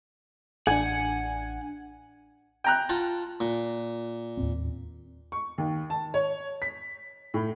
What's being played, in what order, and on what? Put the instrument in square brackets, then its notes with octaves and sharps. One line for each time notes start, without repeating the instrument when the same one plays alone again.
[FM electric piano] A1 D4 [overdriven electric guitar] F#5 [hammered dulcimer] G#5
[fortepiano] G5 A#5 F#6
[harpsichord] F4 F#5 A5
A#2
[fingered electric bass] D#2 A2 C4
[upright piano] C#6
D#2
A5
C#5
B6
A2